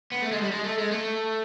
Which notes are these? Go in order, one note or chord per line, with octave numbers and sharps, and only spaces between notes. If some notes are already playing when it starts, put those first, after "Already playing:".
B3
A3
G#3
G3
G#3
A3
G#3
A3